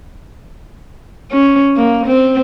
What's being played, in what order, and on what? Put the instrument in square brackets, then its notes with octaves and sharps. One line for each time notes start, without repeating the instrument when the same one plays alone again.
[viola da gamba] C#4
A#3
C4